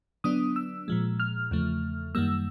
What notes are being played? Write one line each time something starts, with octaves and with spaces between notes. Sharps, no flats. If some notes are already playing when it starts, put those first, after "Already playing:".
D3 F#3 B3 D4 D#6
E6
A#2 F3 G#3
F6
E2 C#3 F3 A3
F#2 D#3 G3 A#3 E6